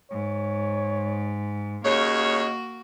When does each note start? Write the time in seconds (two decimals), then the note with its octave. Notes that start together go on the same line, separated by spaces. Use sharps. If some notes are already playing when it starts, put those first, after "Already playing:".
0.11 G#2 C#5
1.85 D#2 C#3 A#3 F#4 C#5 D#5